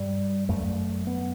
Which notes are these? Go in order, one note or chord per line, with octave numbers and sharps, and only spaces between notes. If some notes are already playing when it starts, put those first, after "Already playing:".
Already playing: G2 G3
F#2 A3
B3